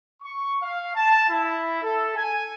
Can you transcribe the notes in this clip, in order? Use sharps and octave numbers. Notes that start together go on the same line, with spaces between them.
C#6
F5
A5
E4
A4
G#5